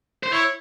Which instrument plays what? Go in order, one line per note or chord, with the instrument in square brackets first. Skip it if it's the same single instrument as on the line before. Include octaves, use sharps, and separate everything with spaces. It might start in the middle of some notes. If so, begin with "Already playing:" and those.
[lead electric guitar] C5
[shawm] E4 [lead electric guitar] C#5